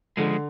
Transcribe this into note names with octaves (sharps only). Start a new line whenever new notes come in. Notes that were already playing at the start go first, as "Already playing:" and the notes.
D3 F3 G#3